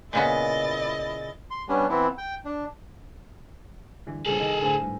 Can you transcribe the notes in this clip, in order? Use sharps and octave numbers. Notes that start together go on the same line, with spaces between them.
A#2 C#3 B3 E4 D#5 A6
C6
G3 B3 C#4 D4
E3 B3 C4 E4
G5
D4
G1 D3 E3
E2 G2 A#2 C#3 F3 G#4 A4
C2 D#3 D#4
A2 D3 C5 G#5
G#1 G2